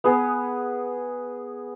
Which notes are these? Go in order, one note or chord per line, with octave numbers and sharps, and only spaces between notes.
B3 G#4